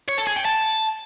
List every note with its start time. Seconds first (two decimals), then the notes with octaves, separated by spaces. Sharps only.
0.08 C#5
0.18 A4
0.27 G#4
0.36 G5
0.45 A5